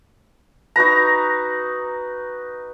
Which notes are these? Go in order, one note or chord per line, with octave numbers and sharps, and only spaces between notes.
D#4 F#4 B4 A#5